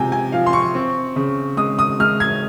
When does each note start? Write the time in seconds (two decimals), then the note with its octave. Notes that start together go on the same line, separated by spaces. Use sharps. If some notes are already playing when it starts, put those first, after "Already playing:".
Already playing: C3 F3 G#3 G5 G#5
0.12 G#5
0.32 F3 F5
0.46 C6
0.53 C#6
0.75 C4
1.16 C#3
1.57 G#3 D#6
1.79 D#6
2.00 G#3 F6
2.20 G#6